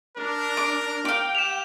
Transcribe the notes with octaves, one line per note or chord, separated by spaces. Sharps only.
D4 A#4
D6
F5 G5 D6
G4 E7 F7